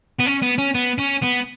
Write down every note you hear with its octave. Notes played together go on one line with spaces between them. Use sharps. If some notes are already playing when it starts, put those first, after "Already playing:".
B3
C#4
B3
C#4
B3
C#4
B3